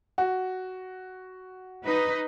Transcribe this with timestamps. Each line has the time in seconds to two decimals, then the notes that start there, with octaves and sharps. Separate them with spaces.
0.18 F#4
1.86 D#4 B4